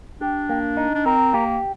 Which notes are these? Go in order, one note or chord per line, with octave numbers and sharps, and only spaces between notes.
D4 G4
A#3
D#4
D4
C4 A#4
A#3 G4